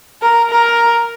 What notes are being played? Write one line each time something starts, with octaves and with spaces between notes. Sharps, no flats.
A#4
A#4